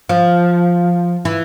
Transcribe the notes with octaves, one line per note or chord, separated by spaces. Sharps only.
F3
E3